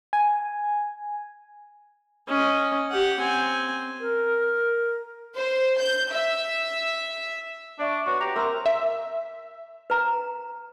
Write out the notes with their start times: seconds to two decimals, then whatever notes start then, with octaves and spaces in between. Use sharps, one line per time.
0.13 G#5
2.28 C#4 D#5
2.91 G4 F#5
3.20 C4 G#5
4.00 A#4
5.36 C5
5.80 G6
6.10 E5
7.79 D4 D5 E5 C#6
8.06 F#4 B4 C#5 C#6
8.20 G4 A#5 A#6 F7
8.36 C4 A#4 E5 A#5 C6
8.66 E5
9.90 B4 A#5